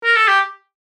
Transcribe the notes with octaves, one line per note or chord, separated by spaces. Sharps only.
A#4
A4
G4